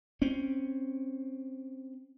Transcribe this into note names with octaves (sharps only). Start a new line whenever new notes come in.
C4 C#4